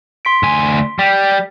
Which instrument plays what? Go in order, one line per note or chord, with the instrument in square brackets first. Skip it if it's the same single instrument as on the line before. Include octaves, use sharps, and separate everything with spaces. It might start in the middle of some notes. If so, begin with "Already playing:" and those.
[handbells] C6 B6 D7
[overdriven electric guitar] D2 G#5
[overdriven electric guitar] G3 [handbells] G5